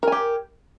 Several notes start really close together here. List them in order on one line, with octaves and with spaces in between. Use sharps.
A#4 G#5 G4